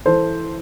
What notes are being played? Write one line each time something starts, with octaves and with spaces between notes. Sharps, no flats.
E3 A4 C5